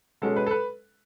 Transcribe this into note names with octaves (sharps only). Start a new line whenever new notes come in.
B2 G#3 C#4 A4
B4
A4
B4